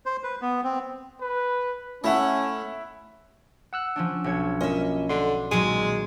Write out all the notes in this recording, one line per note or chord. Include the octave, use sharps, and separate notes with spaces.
C5
B4
B3
C4
B4
A3 C#4 E4 E5 F#5
F#5 E6 F#6
F3 C#4 D4
B1 C#5 G#6
A#3 C#4 F4 D#5 E5
D3 C6
A#2 D#3 F#3 G#3